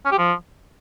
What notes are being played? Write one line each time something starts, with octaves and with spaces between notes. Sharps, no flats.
C#4
G4
F3